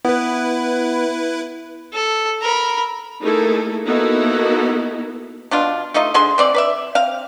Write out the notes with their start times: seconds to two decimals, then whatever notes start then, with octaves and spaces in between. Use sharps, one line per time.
0.05 B3 E4 B4
1.94 A4
2.41 A#4 B5
3.21 A3 A#3 D#4 E4 G#4 A4
3.85 A#3 B3 D#4 E4 F#4 A4
5.51 B2 D4 F4
5.94 A3 D#4 F4 D#5
6.14 D3 G#4 C6
6.38 E3 C4 D5
6.54 B4 D5 E5
6.95 C4 F5